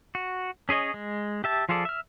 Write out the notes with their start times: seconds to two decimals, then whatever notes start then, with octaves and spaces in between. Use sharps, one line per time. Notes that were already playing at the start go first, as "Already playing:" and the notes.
0.15 F#4
0.69 C#4 G#4 C#5 D#5
0.94 G#3
1.44 G4 E5 A5
1.69 F3 F4 G#4 A4 D5
1.85 E5 F6